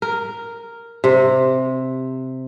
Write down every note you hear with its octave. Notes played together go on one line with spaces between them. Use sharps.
A#4
C3